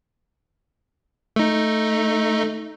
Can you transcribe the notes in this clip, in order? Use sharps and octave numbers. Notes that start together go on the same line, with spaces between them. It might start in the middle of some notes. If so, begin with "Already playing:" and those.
A3 D#4